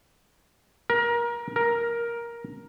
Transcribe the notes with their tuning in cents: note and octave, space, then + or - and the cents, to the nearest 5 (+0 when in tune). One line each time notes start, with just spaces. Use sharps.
A#4 +25
A#4 +10